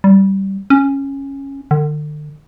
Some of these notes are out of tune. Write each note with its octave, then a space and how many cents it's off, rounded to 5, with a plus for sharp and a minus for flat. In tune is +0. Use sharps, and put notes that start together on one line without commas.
G3 -15
C#4 -10
D3 +40